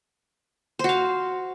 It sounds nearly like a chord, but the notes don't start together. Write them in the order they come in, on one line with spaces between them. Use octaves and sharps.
C5 F#4 F5